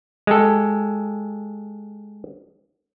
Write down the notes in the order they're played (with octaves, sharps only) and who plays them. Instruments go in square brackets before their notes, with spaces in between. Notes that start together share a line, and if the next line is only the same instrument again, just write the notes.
[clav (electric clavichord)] G#3 G4 A4